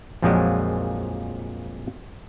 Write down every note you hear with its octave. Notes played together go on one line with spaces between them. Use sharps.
A#1 F2 A#2 F3 F#3 G#3